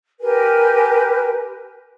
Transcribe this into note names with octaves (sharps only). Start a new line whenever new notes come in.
G4 A#4 B4 G#5